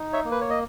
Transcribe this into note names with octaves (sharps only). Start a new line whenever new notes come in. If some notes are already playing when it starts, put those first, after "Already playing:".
Already playing: D#4
C#5 E5
A#3
B4
C#5
D#5